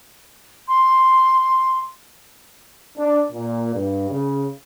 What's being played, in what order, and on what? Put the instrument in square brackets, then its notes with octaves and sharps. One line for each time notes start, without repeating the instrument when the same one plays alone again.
[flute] C6
[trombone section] D4
A#2
G2
C#3